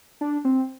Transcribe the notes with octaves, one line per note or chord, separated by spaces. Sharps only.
D4
C4